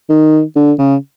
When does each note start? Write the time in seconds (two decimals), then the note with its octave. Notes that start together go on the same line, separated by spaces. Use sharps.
0.09 D#3
0.56 D3
0.79 C#3